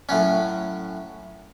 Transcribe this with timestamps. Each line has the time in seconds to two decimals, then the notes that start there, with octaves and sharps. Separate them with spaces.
0.09 A2 F#3 C#4